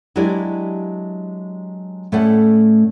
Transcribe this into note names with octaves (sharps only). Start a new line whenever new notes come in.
F#3 G#3 D4 E4 G4 D5
A2 A3 C#4 A4 D5 F#5